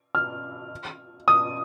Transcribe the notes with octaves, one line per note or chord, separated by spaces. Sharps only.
F6
D#6